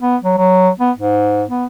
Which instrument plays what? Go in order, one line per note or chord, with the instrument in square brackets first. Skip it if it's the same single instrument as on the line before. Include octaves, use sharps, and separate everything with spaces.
[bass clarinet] B3
F#3
F#3
B3
G#2
B3